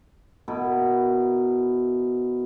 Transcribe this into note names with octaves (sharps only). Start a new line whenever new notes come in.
B2 E4 A#4 B5